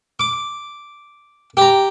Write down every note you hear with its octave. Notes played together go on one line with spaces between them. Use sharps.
D6
G4 A#5